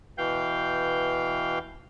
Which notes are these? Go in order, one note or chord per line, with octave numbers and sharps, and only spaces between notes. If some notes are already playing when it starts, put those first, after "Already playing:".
B2 E3 F5 G5 G6